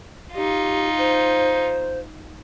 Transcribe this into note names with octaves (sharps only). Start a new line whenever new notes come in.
D#4 F4 G4
C5